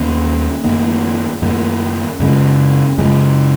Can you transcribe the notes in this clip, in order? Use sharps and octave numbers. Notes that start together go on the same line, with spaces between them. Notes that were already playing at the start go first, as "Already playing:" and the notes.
Already playing: D#2 D#3 A#3 C#4
F#2 D#3 A#3
F#2 D#3 A#3
F#2 C#3 G#3 C#4
F#2 C#3 G#3 C#4